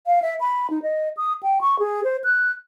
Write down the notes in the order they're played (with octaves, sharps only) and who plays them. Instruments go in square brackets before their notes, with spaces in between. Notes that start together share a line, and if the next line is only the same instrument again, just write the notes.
[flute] F5
E5
B5
D#4
D#5
D#6
G5
C#6
G#4
C5
F#6